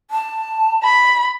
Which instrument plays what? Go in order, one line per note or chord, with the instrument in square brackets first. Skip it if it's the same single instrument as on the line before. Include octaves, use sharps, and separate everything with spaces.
[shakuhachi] A5
[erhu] B5